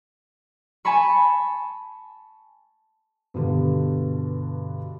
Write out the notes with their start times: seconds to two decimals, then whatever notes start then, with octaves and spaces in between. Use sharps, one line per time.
0.85 G#5 A5 B5 C#6
3.34 G2 B2 D3